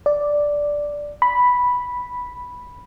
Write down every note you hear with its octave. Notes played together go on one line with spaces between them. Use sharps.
D5
B5